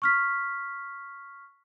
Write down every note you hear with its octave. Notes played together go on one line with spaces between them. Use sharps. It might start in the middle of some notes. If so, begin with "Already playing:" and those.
C#6 F6 B6